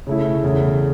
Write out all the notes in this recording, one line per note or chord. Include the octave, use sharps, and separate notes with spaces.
C#3 A3 E4
E2 C#3 A3 E4